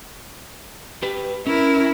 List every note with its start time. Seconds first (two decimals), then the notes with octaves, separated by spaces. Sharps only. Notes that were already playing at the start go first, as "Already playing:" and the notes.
1.03 G4 B4
1.47 C#4 E4 A#4